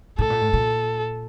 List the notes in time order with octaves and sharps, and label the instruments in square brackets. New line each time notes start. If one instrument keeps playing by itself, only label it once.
[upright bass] A2 [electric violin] A4
[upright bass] A#2
A2
A#2